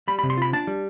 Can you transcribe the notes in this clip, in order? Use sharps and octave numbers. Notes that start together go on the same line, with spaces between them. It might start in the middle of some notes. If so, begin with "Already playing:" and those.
G3 B5
B5
C3
C6
F4 B5
D4 A5
G3